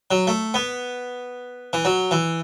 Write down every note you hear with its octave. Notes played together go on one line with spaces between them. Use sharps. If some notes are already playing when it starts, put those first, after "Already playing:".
F#3
A3
B3
E3
F#3
E3